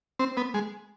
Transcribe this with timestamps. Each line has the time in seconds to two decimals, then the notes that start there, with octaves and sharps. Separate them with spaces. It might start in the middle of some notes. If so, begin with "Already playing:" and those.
0.19 C4
0.37 B3
0.54 G#3